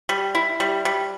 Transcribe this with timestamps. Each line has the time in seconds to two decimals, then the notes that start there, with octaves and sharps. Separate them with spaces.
0.09 G3
0.35 E4
0.60 G3
0.85 G3